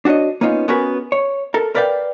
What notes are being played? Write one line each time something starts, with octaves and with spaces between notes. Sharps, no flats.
D4 F#4 G#4 C#5 D#5
A#3 B3 C#4 D#4 F4
B3 C#4 F#4 G#4 A#4 B4
C#5
A4 A#4
A#4 B4 D5 F5 G5